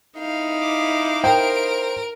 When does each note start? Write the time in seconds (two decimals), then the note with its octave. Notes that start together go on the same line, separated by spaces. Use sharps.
0.17 D#4 E4 F5
0.61 D6
1.24 A#4 C5 G5 D7